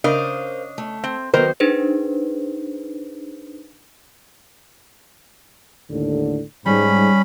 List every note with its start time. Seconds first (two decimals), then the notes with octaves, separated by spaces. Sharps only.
0.04 C#3 D4 A#4 C5 D#5 F5
0.78 A3
1.04 C4
1.34 D#3 F#3 B3 A#4 C5
1.60 D4 D#4 G#4 B4 C5
5.90 D#2 A2 D3
6.66 G#2 G3 C#4 B5